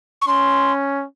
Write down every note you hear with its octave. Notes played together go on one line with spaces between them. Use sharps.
C#6
C#4 C6